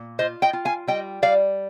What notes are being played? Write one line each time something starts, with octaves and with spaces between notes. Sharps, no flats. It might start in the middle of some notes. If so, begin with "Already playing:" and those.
Already playing: A#2
F4 C5 D#5
D#5 G5
F4
F5 G#5
G3 D#5 G5
G3 D5 F5